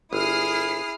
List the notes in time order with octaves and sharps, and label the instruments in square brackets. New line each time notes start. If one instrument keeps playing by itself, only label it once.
[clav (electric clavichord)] G1 [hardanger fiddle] E4 G#4 [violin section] D#6 F6 C7